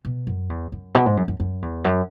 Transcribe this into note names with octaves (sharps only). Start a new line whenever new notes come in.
B2
F#2
E2
F#2
B2
G#2
F#2
F#2
F#2
E2
F#2